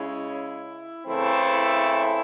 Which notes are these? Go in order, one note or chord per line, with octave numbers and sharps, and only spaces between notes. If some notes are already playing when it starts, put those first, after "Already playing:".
Already playing: C#3 G#3 C#4 E4
C#3 E3 A3 C4 E4